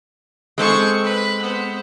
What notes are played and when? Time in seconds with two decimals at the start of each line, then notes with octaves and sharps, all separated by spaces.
0.58 G#3 C4 G#4 A4 C#6
1.03 B4
1.41 B3 C5